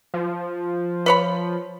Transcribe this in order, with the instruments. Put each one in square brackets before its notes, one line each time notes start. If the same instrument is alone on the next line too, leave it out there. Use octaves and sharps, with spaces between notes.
[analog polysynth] F3
[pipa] B4 C#5 B5